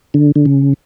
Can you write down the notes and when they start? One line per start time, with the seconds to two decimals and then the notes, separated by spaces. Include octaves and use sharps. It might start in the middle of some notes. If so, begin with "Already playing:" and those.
0.14 D3
0.36 D3
0.45 C#3